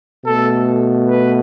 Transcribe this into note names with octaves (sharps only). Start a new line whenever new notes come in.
B2 A3 A4
B4